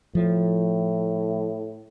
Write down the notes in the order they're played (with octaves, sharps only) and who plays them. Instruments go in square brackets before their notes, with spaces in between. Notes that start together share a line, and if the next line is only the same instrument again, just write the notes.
[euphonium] A2 [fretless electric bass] F3